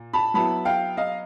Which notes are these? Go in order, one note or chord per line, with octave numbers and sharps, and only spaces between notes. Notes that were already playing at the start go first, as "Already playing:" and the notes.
Already playing: A#2
A5 B5
F#3 B3 E4 A5 B5
F5 G5
D#5 F5